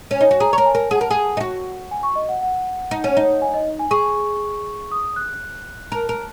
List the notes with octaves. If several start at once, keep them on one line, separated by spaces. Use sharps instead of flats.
C#4 G#5
D#4
F#4
G#4 A#5
A#4 C#5 A#5
G#5
A#4
G#4 F#5
A#4
G#4
D#4
F#4
G#5
C#6
D#5
F#5
F#5
D#4
C#4
D#4
G#5
D#5
G#5
G#4 C#6
D#6
F#6
A#4
A#4